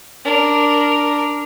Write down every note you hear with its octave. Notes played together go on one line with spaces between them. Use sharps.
D4 A#4